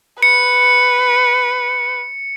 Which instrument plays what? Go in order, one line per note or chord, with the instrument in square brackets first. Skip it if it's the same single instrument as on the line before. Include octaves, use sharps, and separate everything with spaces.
[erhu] B4 [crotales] C#7